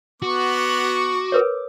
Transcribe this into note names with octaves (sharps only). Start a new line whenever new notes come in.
B3 F#4 C#6 D6
A#4 B4 C#5